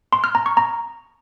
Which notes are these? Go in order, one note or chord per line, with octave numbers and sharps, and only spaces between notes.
C6
F6
A#5
C#6
A#5